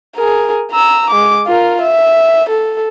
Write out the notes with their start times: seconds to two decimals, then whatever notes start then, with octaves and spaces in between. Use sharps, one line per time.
0.16 G#4 A#4
0.72 A#5 E6
1.10 G#3 D6
1.47 F4 A#4
1.81 E5
2.49 A4